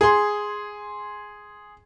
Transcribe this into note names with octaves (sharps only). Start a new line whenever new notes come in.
G#4 C6